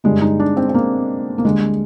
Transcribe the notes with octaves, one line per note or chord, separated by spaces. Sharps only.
G2 D3 G3 G#3
D#4
D4
C4
C4
A#3
A#3
D2 D3 G3 G#3